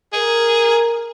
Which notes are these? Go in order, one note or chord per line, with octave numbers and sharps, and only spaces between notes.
G#4 A#4